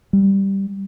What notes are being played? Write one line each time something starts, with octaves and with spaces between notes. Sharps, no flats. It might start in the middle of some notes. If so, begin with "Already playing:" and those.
G3